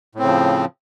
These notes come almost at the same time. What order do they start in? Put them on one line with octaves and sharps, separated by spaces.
A2 C4 C#3 F3